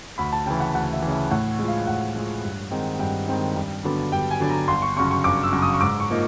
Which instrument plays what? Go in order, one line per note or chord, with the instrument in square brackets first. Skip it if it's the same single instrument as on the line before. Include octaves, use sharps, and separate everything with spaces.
[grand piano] D2 B5
A5
C#3 E3 G5
F#5
D2 F#5
E5
C#3 E3
E5
A2 F#5
F3 G#3
F5
A2 F#5
F3 G#3
G2
D#3 G#3 C4 D#4
G2 G5
D#3 G#3 C4 D#4
G2
D3 F#3 B3 D4
G2 G5
G#5
D3 F#3 B3 D4
A#5
G1 C6
C#6
F#2 C#3 C#6
C#6
G1 D6
E6
F#2 C#3
D#6
C#6
G#2 D6
C#6
F3 A#3 D#4